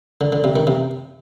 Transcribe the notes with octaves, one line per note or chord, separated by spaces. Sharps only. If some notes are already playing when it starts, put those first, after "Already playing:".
D3
D3
C3
D#3
C3